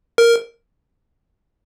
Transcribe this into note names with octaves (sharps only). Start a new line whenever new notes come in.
A#4